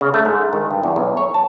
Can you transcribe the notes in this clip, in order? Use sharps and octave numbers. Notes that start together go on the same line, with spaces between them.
C#3
A3
G#2
D#3
G2
E2
B1
C#5
A5